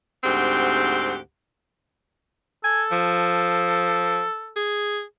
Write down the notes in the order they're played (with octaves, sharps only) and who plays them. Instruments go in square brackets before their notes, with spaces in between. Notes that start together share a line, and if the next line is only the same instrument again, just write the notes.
[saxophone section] D2 G#2 C4 G4 F#5
[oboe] A4 [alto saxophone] G#5
[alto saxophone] F3
G#4